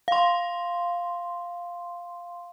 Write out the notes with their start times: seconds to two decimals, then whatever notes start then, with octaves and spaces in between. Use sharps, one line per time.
0.08 F5 C6